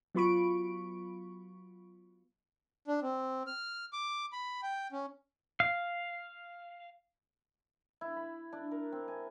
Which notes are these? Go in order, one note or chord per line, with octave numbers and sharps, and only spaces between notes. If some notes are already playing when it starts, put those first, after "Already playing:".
F#3 B3 F4 B5 C#6 D7
D4
C4
F6
D6
B5
G5
C#4
F5
E4
B5
D4
A#4
C4
G#5